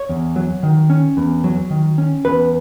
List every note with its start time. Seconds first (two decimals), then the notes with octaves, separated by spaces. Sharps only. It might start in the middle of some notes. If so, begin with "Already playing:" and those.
Already playing: C#5
0.09 E2
0.36 F#3
0.63 D#3
0.90 C#4
1.17 E2
1.44 F#3
1.70 D#3
1.98 C#4
2.25 E2 B4